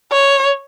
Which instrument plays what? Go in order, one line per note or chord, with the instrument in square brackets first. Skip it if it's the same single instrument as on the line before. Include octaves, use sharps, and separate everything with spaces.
[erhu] C#5